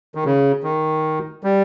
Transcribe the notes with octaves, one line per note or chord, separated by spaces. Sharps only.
D#3
C#3
D#3
G3